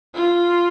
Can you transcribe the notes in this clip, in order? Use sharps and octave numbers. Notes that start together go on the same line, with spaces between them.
F4